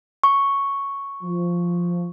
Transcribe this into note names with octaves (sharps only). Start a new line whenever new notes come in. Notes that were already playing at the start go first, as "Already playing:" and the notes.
C#6
F3